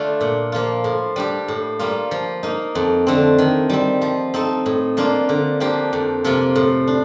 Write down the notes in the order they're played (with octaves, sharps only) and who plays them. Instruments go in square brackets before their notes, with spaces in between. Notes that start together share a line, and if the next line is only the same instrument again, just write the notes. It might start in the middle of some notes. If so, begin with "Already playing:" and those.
Already playing: [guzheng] D3 A3 D4 F4
A#2
F3 A#3 F4
A2
G3 D4 G4
A2
G3 A#3 F4
F3
A#3 D#4
F2
D3 A3 C4
D#3
G3 C4
F3
C4 D#4 A4
A2
F3 A#3 D4 F4
D3
F3 A#3 D4 G4
F2
C3 F3 A#3 F4
A2
D4